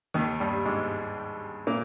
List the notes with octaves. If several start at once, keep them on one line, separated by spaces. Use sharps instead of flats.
D#2 D#3
G2 G3
G#2 G#3
A#2 A#3